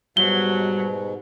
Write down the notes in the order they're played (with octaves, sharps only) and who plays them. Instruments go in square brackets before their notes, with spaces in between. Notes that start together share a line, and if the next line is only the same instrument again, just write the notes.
[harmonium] G#2 B2 [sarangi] F#3 [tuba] G3 [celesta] G7